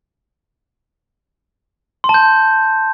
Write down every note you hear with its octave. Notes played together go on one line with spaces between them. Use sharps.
C6
A5
G6